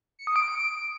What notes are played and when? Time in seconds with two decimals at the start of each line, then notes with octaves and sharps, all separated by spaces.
0.19 C#7
0.27 D#6
0.36 D7